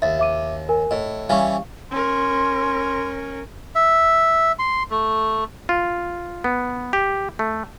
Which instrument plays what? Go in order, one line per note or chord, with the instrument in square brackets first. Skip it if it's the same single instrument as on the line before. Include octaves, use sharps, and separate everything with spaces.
[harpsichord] D#2 [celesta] E5 A6
[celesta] E5 D6 D#7
A#4 G#5
[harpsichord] A2 [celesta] D#5
[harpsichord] E3 G3 C#4 [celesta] F5 C#6
[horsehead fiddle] C#4 A#4 [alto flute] C6
[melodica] E5
C6
A3
[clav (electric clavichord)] F4
B3
G4
A3